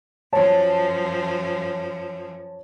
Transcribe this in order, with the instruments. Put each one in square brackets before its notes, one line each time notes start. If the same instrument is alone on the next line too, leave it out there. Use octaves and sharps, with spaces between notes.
[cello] F#2 F3 [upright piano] C#5 A5